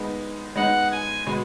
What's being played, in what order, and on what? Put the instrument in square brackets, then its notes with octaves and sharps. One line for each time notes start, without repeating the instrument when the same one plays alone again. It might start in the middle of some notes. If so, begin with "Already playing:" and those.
Already playing: [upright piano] G#3 B3 D#4
[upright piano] G#3 B3 D#4 [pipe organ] F#5
[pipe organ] G#5
[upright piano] B2 G#3 B3